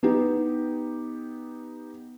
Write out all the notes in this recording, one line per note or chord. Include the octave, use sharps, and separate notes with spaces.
B3 D#4 G4